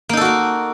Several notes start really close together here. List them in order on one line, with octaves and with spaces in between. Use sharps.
A#3 D#4 A4 F#4 A#4